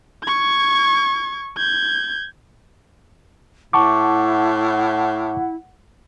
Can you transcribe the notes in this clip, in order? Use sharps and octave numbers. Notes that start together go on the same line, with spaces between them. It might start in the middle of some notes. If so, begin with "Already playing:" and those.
C#6 G#6
G6 G#6
A2 E4 F#5 A5 C#6 D6